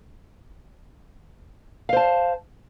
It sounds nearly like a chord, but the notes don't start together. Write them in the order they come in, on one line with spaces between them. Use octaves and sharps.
F5 C5 A5